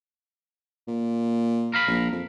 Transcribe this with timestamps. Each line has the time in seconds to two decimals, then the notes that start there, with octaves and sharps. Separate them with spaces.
0.88 A#2
1.74 A#4 F5 B5
1.88 A#1
2.12 F2